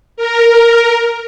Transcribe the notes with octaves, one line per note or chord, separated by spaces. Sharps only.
A#4